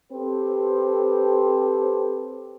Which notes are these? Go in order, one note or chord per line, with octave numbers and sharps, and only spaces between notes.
C4 G4 A4 B4 C5